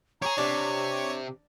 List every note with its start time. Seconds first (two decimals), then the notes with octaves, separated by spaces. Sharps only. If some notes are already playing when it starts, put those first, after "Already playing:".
0.22 G4 G#4 C#5 A#5 C#6
0.38 C3 D4 G4